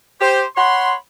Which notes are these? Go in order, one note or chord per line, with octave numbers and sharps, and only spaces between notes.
G4 C5
C#5 F#5 B5 C6